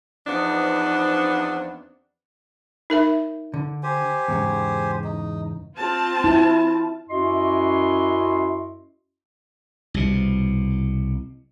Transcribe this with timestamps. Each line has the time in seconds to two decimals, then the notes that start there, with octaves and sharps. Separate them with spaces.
0.27 E2 F3 B3 C4 D4 D#4
2.90 D#4 A#4 E5
3.54 D3
3.83 G4 C5 G#5
4.28 E2 G#2 C#3
5.04 D#4
5.77 C4 F4 A5
6.24 E4
7.09 F#2 C#4 E4 F#4 D#5 C6
9.94 C2 B2